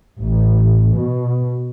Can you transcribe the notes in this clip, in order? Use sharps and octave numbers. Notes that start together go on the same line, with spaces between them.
A1
B2